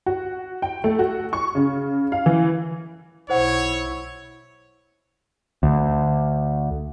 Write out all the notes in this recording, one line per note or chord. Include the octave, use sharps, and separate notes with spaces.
F#4
G5
A3
F#4
C#6
C#3
F5
E3
B1 E4 C5 C#5 F#5
D2